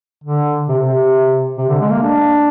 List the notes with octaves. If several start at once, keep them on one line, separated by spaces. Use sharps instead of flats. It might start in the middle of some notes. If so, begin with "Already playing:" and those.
D3
C3
C3
C3
D3
G#3
A#3
D4